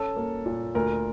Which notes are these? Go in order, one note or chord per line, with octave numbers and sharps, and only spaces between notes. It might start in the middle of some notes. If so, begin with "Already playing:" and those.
Already playing: C#4 A4
A#3
A#2
D2 A#4